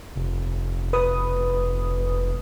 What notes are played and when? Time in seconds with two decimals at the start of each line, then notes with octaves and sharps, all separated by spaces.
0.16 F1
0.93 B4 D#6